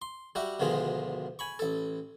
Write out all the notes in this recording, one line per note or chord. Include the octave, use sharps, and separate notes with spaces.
C6
G3 F#4 G4 E5
D2 G#2 B2 D#3 F3 G#3
G#5 B5 C#6
A1 A4